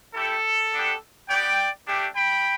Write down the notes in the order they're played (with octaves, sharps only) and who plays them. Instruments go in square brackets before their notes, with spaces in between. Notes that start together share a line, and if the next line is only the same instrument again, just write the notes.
[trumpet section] A3 E4 G4 A4
B3 D4 G4
B3 G4 D5 G5
A3 D4 G4
G5 B5